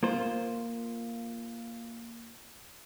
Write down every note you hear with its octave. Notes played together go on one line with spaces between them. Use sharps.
A#3 F4 C5